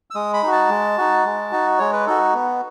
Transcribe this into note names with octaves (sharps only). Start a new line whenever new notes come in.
E6
G#3 D#6
B5
D#4 F#4
A5
G#3
D#4 F#4
G#3
D#4 F#4
G#3 C#5
B4
D#4 F#4 A4
B3